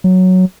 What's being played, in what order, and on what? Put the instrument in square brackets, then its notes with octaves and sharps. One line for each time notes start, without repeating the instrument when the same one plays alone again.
[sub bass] F#3